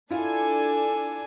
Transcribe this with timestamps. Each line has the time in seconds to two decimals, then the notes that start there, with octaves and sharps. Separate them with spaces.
0.11 D4 E4 F4 A4 G#5